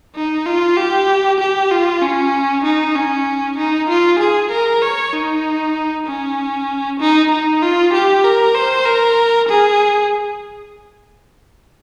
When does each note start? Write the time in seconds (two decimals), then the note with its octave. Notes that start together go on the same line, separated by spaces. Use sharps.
0.16 D#4
0.46 F4
0.77 G4
1.40 G4
1.71 F4
2.02 C#4
2.64 D#4
2.95 C#4
3.57 D#4
3.89 F4
4.19 G#4
4.51 A#4
4.82 C#5
5.12 D#4
6.06 C#4
7.00 D#4
7.31 D#4
7.62 F4
7.93 G4
8.24 A#4
8.54 C5
8.85 A#4
9.48 G#4